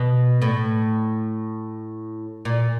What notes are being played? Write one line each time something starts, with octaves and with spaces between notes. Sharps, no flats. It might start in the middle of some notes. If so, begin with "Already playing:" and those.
Already playing: B2
A2
A#2